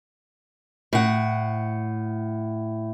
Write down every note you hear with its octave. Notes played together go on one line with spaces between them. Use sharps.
A2 F#5